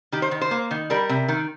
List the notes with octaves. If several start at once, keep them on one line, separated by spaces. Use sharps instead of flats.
D#3 G4
C5
D#3
C5
A#3
D#3
G3 A#4
C3
D#3